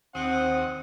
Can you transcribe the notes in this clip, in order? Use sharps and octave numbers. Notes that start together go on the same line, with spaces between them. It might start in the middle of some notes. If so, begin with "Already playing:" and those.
D#2 C4 F#5 D#6